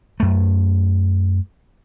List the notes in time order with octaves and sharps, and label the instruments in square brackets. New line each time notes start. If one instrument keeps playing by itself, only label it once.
[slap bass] F#2 A3